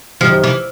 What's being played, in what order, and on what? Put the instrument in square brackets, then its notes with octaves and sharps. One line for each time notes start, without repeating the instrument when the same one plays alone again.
[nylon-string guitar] F#2 D#3 G3 [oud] F3
[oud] E3